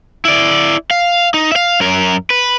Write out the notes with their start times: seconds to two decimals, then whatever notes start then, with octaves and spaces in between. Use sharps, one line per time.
0.25 E4 D5
0.91 F5
1.34 D#4
1.52 E5 F5
1.80 F#2 A#4
2.30 B4